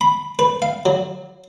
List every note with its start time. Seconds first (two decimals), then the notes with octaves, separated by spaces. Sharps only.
0.01 B5
0.39 B4
0.62 F5
0.86 F#3